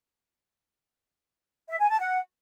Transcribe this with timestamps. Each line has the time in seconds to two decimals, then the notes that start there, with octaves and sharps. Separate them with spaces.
1.69 E5
1.79 G#5
1.90 A5
2.00 F#5